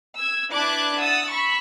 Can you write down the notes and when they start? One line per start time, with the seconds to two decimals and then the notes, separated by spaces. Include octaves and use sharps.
0.16 E6 G#6
0.51 D4 E4 B4 D6 F#6 G#6
1.00 F#5 D#6 E6 A6
1.30 B5 C#6 E6